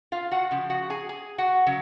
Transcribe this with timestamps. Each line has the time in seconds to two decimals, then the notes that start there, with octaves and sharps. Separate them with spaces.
0.12 F4 F5
0.31 F#4 F#5
0.51 C#3 F3
0.70 F#4 F#5
0.90 G#4 G#5
1.09 G#4 G#5
1.38 F#4 F#5
1.66 C#3 F#3